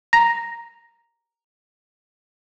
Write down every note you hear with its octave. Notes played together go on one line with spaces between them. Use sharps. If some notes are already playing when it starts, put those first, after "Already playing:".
A#5 A#6